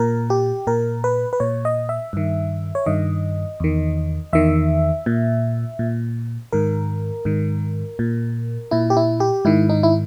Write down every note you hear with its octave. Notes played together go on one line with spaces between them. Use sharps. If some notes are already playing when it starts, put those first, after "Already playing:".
Already playing: A#2 A#4
G4
A#2 A#4
B4
B4
A#2 C#5
D#5
E5
G2 D#3
C#5
G2 D#3 D#5
E2 D#3
E2 D#3 E5
A#2
A#2
G#2 D#3 A#4
G#2 D#3
A#2
A#2 E4
G4
E4
G4
G#2 D#3 E4
D#4
E4